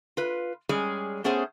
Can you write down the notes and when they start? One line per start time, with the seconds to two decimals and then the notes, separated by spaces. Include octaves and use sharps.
0.17 F4 B4
0.69 G3 G#3 C#4 G#4
1.24 A3 B3 C#4 G#4 C5